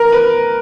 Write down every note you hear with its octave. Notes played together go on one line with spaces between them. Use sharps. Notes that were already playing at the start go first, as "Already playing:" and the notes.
Already playing: A#4
B4